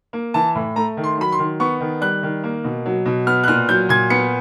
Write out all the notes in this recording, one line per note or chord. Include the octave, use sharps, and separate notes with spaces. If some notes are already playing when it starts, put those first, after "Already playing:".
A#3
E3 A5
A2
A3 A#5
D#3
C6
F#3 B5
C6
D#3
B3 C#6
D#3
G3 F#6
D#3
A#3
B2
F#3
B2
B3 F6
F#6
A#2 F6
F#3 G6
A#2 G#6
B3 C#7